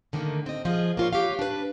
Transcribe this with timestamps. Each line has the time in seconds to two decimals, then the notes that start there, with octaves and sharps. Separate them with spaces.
0.13 D3 D#3 A3 A#3
0.46 C4 D#5
0.65 F3 F4 G#4 D#5
0.97 A#3 F4 C#5
1.13 G4 B4 C#5 F5
1.39 D4 B4